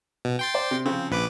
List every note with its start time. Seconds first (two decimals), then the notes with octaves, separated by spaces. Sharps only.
0.25 B2
0.39 G5 C6 A6
0.54 C5 D5
0.71 C3
0.85 C#3 F3 C4
1.11 A#1 B4 D6